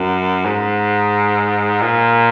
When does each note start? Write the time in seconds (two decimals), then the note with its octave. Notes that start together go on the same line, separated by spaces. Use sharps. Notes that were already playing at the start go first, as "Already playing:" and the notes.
Already playing: F#2
0.46 G#2
1.82 A#2